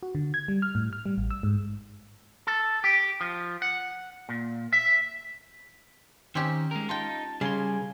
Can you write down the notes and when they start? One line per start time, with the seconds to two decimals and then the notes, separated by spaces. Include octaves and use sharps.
0.03 F#4
0.15 D3
0.34 G#6
0.48 G3
0.62 F6
0.75 A2
0.93 F6
1.06 G3
1.18 A1
1.31 E6
1.43 G#2
2.47 A4
2.84 G4
3.21 F3
3.62 F#5
4.29 A#2
4.73 E5
6.35 D#3 C4 C#4 G4
6.71 G#3 A#4
6.89 D#4 F4 G5 A5
7.41 C#3 G3 F5 G#5 C6